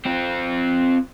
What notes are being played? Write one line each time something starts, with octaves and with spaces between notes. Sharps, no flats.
C4 F4